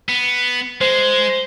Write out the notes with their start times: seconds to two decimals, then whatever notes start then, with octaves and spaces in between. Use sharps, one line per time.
0.09 B3
0.81 G#3 C5